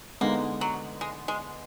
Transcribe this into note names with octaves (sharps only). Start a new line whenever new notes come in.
D3 G#3 A#3 B3 D#4
F#3
G#3
G#3